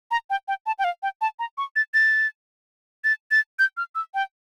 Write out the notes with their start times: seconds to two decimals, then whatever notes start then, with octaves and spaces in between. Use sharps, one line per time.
0.11 A#5
0.30 G5
0.48 G5
0.66 A5
0.79 G5
0.84 F5
1.03 G5
1.21 A5
1.39 A#5
1.58 C#6
1.76 A6
1.94 A6
3.04 A6
3.31 A6
3.59 G6
3.77 F6
3.95 E6
4.14 G5